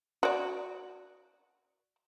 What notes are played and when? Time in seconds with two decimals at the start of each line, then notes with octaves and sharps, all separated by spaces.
0.23 F#4 D5